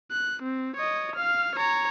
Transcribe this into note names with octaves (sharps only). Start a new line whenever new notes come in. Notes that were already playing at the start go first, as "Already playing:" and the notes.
F#6
C4
C#5 D#5
F5 F6
C#5 A#5